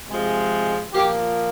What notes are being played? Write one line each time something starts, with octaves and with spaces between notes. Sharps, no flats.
C3 F3 G#3
A#2 F3 A#3 G4